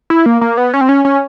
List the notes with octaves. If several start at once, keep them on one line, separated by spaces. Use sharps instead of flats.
E4
A#3
A#3
B3
C#4
C4
C#4
C#4